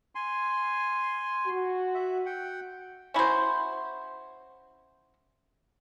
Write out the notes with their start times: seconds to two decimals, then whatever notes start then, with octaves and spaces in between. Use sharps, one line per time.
0.15 G#5 C6
1.47 F#4
1.95 E5
2.26 F#5 G5
3.14 C#4 E4 F#4 C5